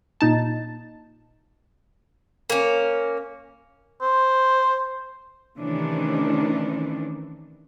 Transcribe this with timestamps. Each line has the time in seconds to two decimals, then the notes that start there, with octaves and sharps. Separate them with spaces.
0.21 A#2 D#4 A5
2.50 A#3 C#4
4.01 C5
5.58 C3 D#3 E3 A3 C#4 D4